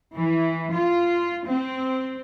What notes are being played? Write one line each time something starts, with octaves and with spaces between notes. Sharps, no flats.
E3
F4
C4